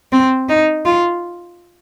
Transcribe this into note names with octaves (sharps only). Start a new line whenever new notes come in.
C4
D#4
F4